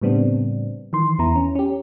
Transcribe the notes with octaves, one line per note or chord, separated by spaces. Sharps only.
A2 C#3 G3 B3 C4 D4
D#3 E3 C6
E2 B3 E4 A#5
C#4
C#4 G4